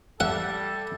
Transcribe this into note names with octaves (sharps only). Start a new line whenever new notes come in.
G3 A4 E5 F#5